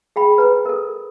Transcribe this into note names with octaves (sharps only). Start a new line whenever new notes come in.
G#4 G5 B5
B4 A#5
A4 A#4